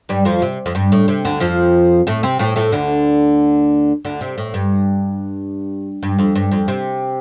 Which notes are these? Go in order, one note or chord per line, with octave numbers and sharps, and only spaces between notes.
G2 G3
F2 F3
C3
F2
G2
A2
C3
D2 D3
F2 F3
A2 A3
C3 C4
A2 A3
A2 A3
D2 D3
D2 D3
C3
A2
G2
G2
F2
G2
F2
C3